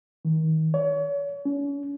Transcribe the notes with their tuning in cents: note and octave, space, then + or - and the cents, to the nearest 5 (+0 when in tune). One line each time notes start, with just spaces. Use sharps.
D#3 +30
C#5 +35
C#4 +40